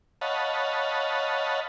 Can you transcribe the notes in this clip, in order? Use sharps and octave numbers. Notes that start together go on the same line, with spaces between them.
C#5 D#5 F5 F#5 A5 B5